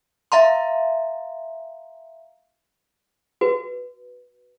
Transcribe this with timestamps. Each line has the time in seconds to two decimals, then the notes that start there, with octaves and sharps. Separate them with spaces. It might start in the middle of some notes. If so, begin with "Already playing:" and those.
0.32 E5 F5 A#5 C6
3.41 F#4 B4